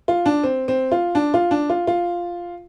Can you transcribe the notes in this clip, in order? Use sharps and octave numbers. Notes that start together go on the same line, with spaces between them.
F4
D4
C4
C4
F4
D4
F4
D4
F4
F4